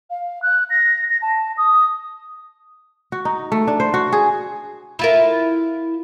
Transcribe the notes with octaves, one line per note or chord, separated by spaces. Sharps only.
F5
F#6
A#6
A#6
A5
D#6
F#4
D#4
A3
D4
C5
F#4
G#4
E4 F4 A#4